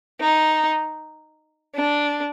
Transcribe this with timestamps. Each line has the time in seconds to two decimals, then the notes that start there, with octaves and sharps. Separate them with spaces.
0.20 D#4
1.76 D4